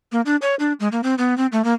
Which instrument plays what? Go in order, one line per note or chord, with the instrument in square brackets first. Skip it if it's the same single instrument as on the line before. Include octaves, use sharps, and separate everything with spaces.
[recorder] A#3
D4
C#5
D4
G#3
A#3
C4
B3
C4
A3
A#3